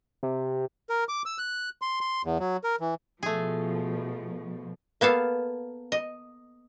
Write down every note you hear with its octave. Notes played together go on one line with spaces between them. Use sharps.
C3
A#4
D6
E6
F#6
C6
C6
E2
F#3
A#4
E3
B2 F3 A3 G#4
A#3 B3 A4 F5
D#5